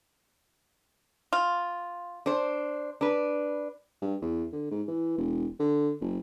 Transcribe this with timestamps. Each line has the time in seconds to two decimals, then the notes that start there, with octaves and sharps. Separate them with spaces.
1.33 F4
2.26 D4 C5
3.01 D4 B4
4.02 G2
4.22 E2
4.53 D3
4.71 G#2
4.88 E3
5.18 E1
5.60 D3
6.01 F#1